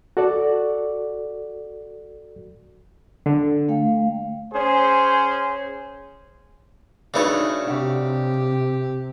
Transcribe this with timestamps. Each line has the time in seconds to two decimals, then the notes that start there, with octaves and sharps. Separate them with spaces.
0.17 F#4 A4 D5
3.26 D3
3.68 A3 F5 G5
4.54 C#4 G#4 C5
7.14 C#3 A3 D4 D#4 F#4 B4 C#5 D5
7.67 C3 D4 F#4 G4 E5